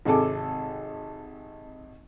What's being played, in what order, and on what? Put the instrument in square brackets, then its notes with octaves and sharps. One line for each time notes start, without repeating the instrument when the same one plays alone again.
[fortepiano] G#1 C3 G#4 A4 D6